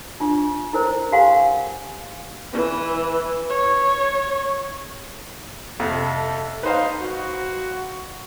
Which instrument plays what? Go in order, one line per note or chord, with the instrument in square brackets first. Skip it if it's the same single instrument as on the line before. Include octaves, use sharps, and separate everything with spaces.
[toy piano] D4 F4 C#6
E4 A#4 C5
G4 F5 F#5 G#5 C6 C#6
[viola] E3
C#5
[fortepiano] F2 C3 [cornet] A4
[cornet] D#4 [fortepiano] B4 C5 F5
[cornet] F#4